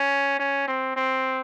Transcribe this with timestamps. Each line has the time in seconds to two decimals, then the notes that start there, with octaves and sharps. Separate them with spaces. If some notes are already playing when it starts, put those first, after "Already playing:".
Already playing: C#4
0.39 C#4
0.68 C4
0.96 C4